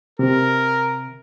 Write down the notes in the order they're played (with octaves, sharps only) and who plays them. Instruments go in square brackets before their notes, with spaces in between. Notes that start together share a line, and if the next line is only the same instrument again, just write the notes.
[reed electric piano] C3 [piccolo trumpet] A#4